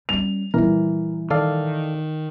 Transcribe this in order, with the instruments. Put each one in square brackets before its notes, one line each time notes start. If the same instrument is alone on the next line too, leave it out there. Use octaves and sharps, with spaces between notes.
[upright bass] G3 C#4 [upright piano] F7
[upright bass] A#2 G3 [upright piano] E3 [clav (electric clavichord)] A#4
[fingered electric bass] D#3 [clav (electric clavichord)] A4 D5 F5